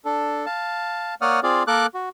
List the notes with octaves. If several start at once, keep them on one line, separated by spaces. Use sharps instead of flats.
D4 A4
F5 A5
A#3 C#5 D5 F#5 D#6 F6
C4 F4 G#4 D5 F5
A#3 A4 A#4 D6 F#6
F#4